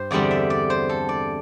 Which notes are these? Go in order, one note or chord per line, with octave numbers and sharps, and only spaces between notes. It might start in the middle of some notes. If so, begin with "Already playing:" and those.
Already playing: G2 G4 C5
E2 D3 G3 C4 D5
E5
D5
C5
A4
D5